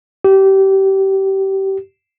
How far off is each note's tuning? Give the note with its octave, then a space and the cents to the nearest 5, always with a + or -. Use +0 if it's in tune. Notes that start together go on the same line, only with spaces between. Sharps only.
G4 -25